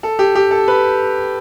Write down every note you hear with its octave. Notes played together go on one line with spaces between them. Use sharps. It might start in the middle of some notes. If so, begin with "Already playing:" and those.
A4
G4
G4
A4
B4